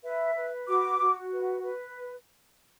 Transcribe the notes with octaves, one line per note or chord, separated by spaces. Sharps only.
B4 E5
B4
F#4 D6
F#4
B4
B4